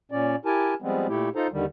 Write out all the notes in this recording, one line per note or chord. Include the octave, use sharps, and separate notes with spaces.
A#2 C#4 D5
E4 G4 A#4 G#5 A5
F3 G3 G#3 B3 C4
A#2 A3 E4 G4
D#4 F4 A4 C5 A#5
D#2 D3 D#3 G3